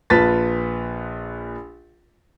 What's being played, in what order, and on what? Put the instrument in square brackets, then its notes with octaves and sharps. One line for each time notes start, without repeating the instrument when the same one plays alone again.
[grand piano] A#1 F4 B4 A5 A6 B6